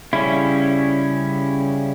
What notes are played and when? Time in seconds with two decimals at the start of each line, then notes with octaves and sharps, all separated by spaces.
0.13 C#3 G3 C#4 E4